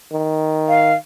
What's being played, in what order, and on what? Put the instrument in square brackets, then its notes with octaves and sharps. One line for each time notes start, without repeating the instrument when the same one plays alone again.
[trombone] D#3
[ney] F5